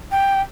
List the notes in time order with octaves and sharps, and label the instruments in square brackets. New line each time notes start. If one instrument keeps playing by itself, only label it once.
[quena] G5